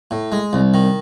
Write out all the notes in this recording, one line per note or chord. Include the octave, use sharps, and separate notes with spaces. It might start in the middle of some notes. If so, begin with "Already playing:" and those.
A2
G#3
C2
D#3